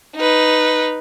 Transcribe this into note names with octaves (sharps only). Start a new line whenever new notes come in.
D#4 B4